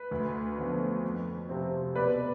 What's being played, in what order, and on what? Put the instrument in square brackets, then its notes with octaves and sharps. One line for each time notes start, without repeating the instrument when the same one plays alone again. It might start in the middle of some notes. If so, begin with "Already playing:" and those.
Already playing: [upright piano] B4
D2
D3 F3 B3
F2
C3 F3 C4
B2 B4 D5